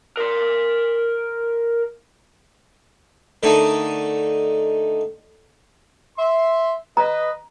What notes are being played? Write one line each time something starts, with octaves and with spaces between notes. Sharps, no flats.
A#4 C6
D3 D#3 A3 D#4
E5 C6
B4 D#5 A#5